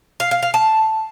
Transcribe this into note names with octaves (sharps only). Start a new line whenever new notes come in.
F5
F5
F5
A5